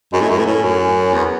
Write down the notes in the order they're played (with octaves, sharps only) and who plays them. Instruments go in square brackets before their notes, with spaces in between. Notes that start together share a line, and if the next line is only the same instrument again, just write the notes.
[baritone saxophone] F#2 [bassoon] G#3
[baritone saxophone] A2 [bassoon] A3
[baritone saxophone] F#2
[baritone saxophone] A2 [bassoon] B3
[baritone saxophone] A2 [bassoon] C#4
[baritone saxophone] F#2
[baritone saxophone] E2 [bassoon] B3